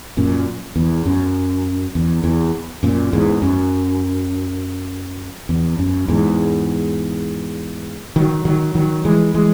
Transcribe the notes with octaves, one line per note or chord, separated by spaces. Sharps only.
F#2 A#2
E2
F#2
E2
E2
F#2 A#2
E2 G#2
F#2
E2
F#2
E2 G#2
D#3 F#3
D#3 F#3
D#3 F#3
E3 G#3
E3 G#3